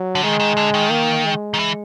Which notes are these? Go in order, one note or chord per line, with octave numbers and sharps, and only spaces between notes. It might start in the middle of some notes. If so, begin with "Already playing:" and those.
Already playing: F#3
D3
D#3 G#3
D#3
D3
D#3
A#3
G#3
D#3
E3